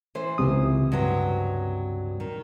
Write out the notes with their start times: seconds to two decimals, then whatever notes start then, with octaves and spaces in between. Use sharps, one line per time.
0.15 E3 C5
0.38 C#2 C3 D#6
0.92 G2 F#3 C4
2.20 D#3